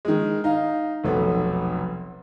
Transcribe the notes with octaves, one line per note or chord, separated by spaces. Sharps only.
D#3 G#3
D#4 F5
F1 B1 B3